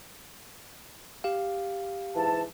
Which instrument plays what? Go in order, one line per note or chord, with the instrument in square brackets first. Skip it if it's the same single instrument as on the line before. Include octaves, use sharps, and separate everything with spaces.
[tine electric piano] G4 F5
[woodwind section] G#2 E3 A5